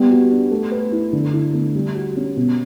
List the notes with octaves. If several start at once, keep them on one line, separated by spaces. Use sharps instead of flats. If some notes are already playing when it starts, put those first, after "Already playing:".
Already playing: G3 B3
F#4
D4
A3
B4
E4
D3
E4
A3
G3
F#4
C#4
B2